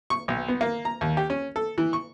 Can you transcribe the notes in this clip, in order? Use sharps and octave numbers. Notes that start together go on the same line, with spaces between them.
C#6
B1
B3
A#3
A#5
D#2
G4
C#4
A4
E3
C#6